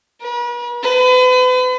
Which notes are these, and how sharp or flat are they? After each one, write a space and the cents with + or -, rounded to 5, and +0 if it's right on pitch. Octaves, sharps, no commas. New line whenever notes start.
B4 -45
B4 +40